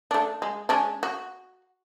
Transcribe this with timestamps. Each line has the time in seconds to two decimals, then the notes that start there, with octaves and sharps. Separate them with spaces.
0.11 A3 D4
0.42 G#3
0.69 G#3 C#4 D4
1.03 F#4